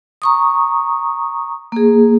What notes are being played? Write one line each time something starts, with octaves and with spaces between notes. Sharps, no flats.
A#5 C#6 D#6
A#3 G#4